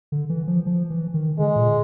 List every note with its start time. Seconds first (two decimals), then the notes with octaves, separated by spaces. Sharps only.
0.12 D3
0.30 E3
0.47 F3
0.66 F3
0.90 E3
1.14 D#3
1.38 D3 G#3
1.56 A#2